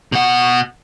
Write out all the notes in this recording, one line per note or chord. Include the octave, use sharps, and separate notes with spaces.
B2 F#5